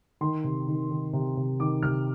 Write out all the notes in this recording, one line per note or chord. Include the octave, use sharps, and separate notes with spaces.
D#3 C6
C3
D#3
D#3
C3
C3
D#3 D6
C3 F6